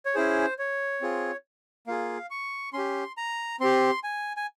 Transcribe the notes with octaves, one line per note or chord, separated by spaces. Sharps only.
C#5
C#4 E4 G#4 C5
C#5
C4 F4 G#4
A#3 F4 G#4 F5
C#6
C#4 G4 C6
A#5
C4 G4 C6
G#5
G#5